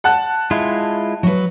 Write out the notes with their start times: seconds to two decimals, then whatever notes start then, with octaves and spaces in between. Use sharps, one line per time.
0.04 F#5 A5 F#6
0.51 G#3 E4 F4
1.23 F#3 B4